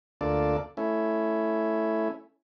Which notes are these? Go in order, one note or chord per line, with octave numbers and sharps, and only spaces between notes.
D2 A#3 D4 F4 A4 D5
A3 C#4 E4